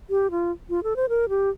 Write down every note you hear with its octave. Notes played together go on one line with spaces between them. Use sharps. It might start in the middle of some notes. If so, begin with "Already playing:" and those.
G4
F4
F4
A4
C5
A#4
G4